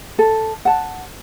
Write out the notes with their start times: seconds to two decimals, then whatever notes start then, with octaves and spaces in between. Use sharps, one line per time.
0.19 A4
0.65 F#5 A5